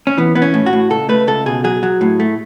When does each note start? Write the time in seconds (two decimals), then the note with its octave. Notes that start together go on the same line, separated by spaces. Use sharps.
0.07 C#4
0.18 E3 B3
0.35 E3 B3
0.42 C#4
0.54 A2
0.66 F#4
0.73 A2
0.90 C#2 A4
1.09 A3 B4
1.27 C#2 A4
1.46 B2 G#4
1.64 F#3 G#4
1.83 F#3
2.01 A2
2.20 A3